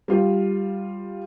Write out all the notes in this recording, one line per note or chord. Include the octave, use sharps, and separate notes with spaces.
G3 F4